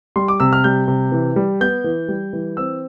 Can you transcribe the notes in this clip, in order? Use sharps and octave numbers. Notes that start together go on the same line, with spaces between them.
G3 C6
D6
C3 E6
F6
G3 G6
C3
E3
G3
B3 G6
E3
G3
E3
C4 E6